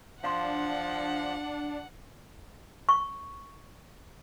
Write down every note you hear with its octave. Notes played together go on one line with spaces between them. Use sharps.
F3 D4 F5 F#5 C6
C#6